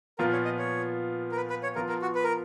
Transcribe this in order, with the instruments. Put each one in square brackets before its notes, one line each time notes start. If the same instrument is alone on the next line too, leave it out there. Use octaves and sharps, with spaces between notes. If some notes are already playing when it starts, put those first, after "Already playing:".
[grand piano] A#2 F3 B3 F4 [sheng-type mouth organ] A#4
[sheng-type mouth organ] C#5
D#5
C#5
A#4
B4
B4
C#5
[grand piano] F3 B3 F4 [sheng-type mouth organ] A#4
[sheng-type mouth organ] A#4
F#4
B4
A#4